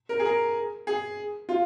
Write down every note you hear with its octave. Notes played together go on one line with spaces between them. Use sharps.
A#4
G#4
A#4
G#4
F4